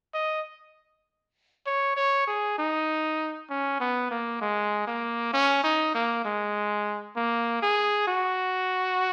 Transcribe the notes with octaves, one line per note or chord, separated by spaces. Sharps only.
D#5
C#5
C#5
G#4
D#4
C#4
B3
A#3
G#3
A#3
C#4
D#4
A#3
G#3
A#3
G#4
F#4